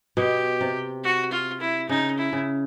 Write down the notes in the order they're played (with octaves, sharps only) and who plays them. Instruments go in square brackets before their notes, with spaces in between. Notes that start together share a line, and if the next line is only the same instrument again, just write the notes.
[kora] B2 [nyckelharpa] G4
[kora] C3
[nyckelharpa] F#4
F4
E4
[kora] C#3 [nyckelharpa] D#4
[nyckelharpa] E4
[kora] C#3